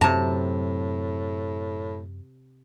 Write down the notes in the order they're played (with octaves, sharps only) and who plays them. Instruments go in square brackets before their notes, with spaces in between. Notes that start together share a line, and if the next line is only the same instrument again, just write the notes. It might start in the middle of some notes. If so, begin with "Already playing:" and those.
[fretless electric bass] F#2 F#3 [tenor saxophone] A2 [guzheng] C3 A#5 [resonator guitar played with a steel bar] A5